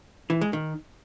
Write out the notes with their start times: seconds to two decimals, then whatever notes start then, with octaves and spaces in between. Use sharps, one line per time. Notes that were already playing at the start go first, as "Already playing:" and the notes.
0.30 E3
0.41 G#3
0.53 D#3